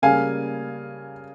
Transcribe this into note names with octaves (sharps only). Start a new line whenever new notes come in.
C#3 G3 A#3 F5 G#5